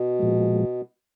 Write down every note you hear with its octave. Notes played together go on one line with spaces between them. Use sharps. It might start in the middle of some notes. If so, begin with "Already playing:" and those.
Already playing: B2
A#2 F3 G#3